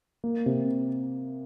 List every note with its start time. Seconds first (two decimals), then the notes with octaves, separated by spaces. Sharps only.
0.24 A#3
0.46 C3